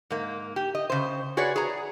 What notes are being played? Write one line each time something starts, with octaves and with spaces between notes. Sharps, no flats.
G#2 A#3
G4
D#5
C#3 C5
F#4 G#4 B4 C#5 D5
G#4 A#5